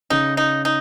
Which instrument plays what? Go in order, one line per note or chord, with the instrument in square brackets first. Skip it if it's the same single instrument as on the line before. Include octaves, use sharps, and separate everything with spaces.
[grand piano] C#3 [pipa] D#4
[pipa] D#4
D#4